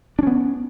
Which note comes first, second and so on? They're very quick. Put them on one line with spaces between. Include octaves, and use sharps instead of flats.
D4 C#4 B3